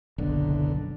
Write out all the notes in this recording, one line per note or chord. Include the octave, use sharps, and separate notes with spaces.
F#1 B1 D3